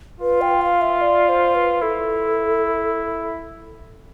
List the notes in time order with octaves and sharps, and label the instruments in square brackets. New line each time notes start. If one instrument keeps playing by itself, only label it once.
[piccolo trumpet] F4 [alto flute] B4
[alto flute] G5
F5
E5
D5
C5
B4
[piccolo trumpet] E4 [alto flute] A4